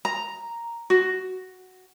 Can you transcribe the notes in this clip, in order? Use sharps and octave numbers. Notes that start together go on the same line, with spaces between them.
A#5
F#4